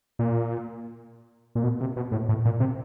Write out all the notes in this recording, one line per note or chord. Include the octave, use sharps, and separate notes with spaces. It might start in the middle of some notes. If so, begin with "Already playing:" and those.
A#2
A#2
B2
C3
B2
A2
A2
A#2
C3